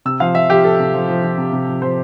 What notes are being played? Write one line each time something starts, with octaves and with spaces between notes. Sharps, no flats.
C3 E6
F3 F5
F3 E5
F3 G4
F3 A4
C3
F3
F3
F3
C3
C3
F3
F3 C5